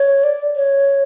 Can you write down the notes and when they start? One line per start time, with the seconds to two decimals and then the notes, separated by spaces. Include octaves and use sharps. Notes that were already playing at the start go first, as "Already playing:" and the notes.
Already playing: C#5
0.24 D5
0.56 C#5